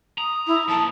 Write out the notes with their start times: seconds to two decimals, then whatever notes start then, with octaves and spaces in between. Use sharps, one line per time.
0.18 A#5 D#6
0.47 E4
0.68 F3 A#3 A5